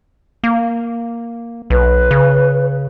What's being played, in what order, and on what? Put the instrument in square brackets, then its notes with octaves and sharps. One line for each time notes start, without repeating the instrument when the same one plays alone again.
[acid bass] A#3
[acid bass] B1 [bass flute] B4
[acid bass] C#3